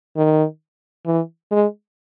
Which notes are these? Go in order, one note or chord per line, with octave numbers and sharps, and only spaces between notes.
D#3
E3
G#3